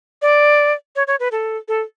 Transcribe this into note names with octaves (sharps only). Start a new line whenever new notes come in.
D5
C#5
C#5
B4
A4
A4